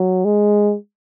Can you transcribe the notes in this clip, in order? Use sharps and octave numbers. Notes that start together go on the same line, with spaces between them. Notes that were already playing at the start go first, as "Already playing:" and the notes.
Already playing: F#3
G#3